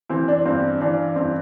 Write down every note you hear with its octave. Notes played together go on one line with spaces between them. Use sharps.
E3 C4 E4
D4
G2 C4
E3 D4
G2 C4 E4